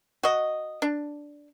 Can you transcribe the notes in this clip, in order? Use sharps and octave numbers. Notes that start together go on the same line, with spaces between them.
F#4 D#5
D4